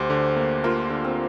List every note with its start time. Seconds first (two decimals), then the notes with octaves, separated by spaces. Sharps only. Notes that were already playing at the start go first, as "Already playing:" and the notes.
Already playing: D2 G4 C5
0.10 D3
0.36 A#3
0.64 A#3 F4 A#4
0.90 D3
1.04 C4